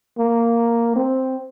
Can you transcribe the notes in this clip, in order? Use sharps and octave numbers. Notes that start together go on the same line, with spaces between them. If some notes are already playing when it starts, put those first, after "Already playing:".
A#3
C4